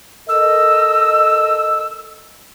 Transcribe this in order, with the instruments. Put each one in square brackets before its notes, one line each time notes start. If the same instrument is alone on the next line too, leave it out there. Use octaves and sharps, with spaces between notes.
[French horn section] A4 A#4 D#5 [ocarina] E6